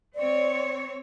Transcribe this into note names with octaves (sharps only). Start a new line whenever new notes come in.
C4 C#5 D5